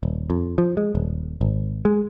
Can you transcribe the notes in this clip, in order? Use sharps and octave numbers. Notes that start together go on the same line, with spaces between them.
D#1
F2
F3
G#3
D#1
G#1
G#3